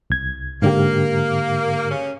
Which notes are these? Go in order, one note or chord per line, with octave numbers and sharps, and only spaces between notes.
C2 G#6
G#2 D3 A#3 G4
C#3 C#4